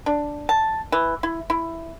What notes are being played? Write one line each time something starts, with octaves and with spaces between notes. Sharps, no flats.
D4
A5
E3
E4
E4